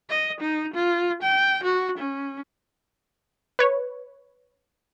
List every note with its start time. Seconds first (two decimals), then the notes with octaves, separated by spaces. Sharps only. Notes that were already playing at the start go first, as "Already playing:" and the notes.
0.10 D#5
0.41 D#4
0.74 F4
1.23 G5
1.64 F#4
1.98 C#4
3.59 B4 C#5